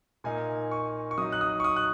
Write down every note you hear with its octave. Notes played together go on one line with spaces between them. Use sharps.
A#2 A#3 D#4 G#5
C#6
C#6
F#3 D#4 D#6
F#6
D#6
C#6
D#6
F#6